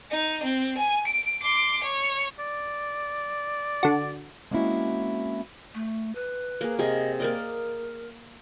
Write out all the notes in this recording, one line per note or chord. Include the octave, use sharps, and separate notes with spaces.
D#4
C4
G#5
D7
C6 D6
C#5
D5
D3 F#4
G#3 A#3 C4 C#4 E4 F#4
A3
B4
A#3 G#4
C3 G#4 D#5
A#3 A#4 D5 D#5